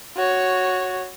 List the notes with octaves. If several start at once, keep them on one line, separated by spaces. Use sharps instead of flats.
F#4 C#5